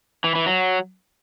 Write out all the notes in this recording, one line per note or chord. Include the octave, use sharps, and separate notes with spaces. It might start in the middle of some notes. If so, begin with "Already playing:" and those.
E3
E3
F#3